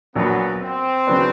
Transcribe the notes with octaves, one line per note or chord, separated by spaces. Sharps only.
A#1 A#2 F#3 B3
C4
C#3 F#3 B3 D4